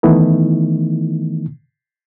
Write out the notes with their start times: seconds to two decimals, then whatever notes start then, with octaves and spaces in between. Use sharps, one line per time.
0.03 D#3 E3 A3 B3 D#4 E4